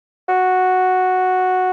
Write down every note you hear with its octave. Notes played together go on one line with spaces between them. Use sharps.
F#4